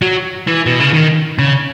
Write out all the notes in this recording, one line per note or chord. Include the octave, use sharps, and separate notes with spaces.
F#3
E3
B2
C#3
D#3
C#3